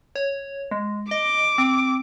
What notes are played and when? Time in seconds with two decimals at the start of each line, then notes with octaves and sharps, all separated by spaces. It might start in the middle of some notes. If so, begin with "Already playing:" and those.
0.16 C#5
0.71 G#3
1.11 D#5 D6
1.58 C4